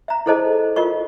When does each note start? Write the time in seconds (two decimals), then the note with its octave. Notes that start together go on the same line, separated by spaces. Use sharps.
0.08 E5 A#5
0.26 E4 G#4 A4 C5 D#5 A5
0.76 F4 A#4 D#5 C#6